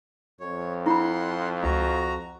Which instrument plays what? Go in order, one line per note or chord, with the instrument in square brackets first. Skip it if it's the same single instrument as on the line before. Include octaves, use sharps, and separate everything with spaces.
[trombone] F2 [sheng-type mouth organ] C#5
[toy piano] E4 B5 [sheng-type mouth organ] F#5 C6
[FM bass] C#2 [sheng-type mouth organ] F#4 A#5